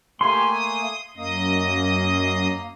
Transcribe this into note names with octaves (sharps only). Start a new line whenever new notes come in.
A3 A#3 G4 G#5 C6
D#6
F#2 A#3 D#5 D#6